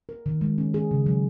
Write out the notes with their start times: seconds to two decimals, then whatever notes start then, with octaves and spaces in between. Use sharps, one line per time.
0.09 A#4
0.26 D#3
0.41 G#3
0.58 C#4
0.74 G#4
0.91 C#3
1.06 F#3